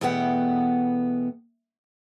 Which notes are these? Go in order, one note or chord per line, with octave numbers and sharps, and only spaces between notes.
E2 B2 A3 B3 F#5 G5